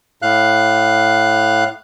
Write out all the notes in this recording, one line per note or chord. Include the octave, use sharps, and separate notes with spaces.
A2 F5 F#6